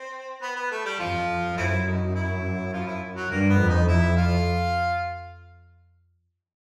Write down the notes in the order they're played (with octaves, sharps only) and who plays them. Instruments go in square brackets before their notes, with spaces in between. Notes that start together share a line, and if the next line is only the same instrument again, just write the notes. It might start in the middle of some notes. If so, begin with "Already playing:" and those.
Already playing: [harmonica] C4 C5
B3 B4
B3 B4
A3 A4
G3 G4
[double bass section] F2 [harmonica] F3 F4
[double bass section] F#2 [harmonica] A3 C4 E4
[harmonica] D#4
E4
F3 F4
E4
F#3 F#4
[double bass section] G2 [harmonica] A#3 A#4
[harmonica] B3 B4
[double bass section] F2
[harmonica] D#4 D#5
[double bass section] F2 [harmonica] E4 E5
[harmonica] F4 F5